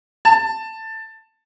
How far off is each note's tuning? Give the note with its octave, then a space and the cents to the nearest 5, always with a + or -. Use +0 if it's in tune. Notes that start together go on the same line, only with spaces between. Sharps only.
A5 +15